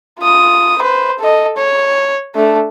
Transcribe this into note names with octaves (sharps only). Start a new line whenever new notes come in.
F4 D#6
B4 C5
A4 D#5
C#5
A3 D4